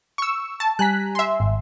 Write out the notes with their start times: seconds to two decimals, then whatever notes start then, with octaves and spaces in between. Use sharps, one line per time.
0.18 C#6 E6
0.60 A5
0.79 G3 G#5 A#5 F#6 B6
1.15 E5 C6
1.40 G#1